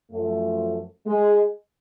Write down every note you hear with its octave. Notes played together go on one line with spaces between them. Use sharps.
F#2 F3 A3
G#3